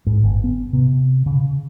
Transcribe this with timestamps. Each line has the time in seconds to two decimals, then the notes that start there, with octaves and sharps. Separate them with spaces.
0.07 G#2
0.23 G1
0.44 B3
0.73 C3
1.26 C#3